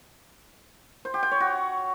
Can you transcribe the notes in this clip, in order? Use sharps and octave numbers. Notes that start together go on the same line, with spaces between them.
C5
G4
G5
C#5
F#4